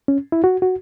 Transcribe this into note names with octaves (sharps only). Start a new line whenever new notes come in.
C#4
E4
F#4
F#4